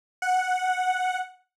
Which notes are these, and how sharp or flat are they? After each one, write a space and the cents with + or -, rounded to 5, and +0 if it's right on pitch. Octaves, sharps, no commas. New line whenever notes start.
F#5 -5